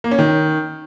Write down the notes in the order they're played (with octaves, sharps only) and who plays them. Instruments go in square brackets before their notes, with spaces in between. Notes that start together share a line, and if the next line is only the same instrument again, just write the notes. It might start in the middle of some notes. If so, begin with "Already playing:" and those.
[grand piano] A#3
C#4
D#3